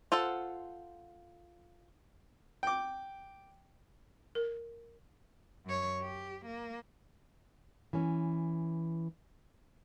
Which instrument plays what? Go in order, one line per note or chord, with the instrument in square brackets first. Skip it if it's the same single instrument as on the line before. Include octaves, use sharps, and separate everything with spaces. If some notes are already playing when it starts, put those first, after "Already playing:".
[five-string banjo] F4 A4 C5 F#5
[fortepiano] G5 D6
[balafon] A#4
[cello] F#2 C#5
G4
A#3
[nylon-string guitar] E3 C#4